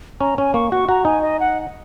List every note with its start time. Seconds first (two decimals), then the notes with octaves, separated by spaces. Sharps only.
0.21 C#4 A#5
0.38 C#4 G#5
0.54 A#3 C#6
0.71 F#4 C#6
0.89 F#4 A#5
1.05 D#4 G#5
1.22 D#5
1.40 F#5